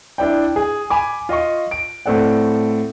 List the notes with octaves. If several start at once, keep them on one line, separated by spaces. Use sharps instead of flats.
D4 E4 D5 G5
G#4
G#5 B5 D6
F4 D#5 F5 C#6
D7
A2 C4 A4 D5 F#5